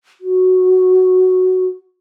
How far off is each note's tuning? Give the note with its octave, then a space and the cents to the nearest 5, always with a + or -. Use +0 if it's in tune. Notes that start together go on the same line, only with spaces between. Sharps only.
F#4 +0